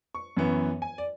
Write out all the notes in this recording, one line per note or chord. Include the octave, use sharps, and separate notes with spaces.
C#6
F#2 E3 B3
G#5
D5